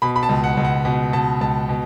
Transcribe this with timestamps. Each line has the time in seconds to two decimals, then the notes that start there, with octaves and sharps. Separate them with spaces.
0.02 B2 B5
0.16 B5
0.23 A5
0.29 C#2
0.44 F#5
0.57 C#2
0.65 F#5
0.85 B2 F#5
1.13 B2 A5
1.41 C#2 A5
1.69 B2